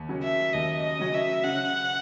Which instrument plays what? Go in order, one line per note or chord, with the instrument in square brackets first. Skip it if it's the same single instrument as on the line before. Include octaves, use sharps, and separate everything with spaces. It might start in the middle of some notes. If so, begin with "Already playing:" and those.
Already playing: [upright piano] D#2
C#3 F#3 C#4
[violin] E5
[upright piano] D#2 [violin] D#5
[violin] D#5
[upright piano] C#3 F#3 C#4
[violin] E5
[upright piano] C#3 [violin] F#5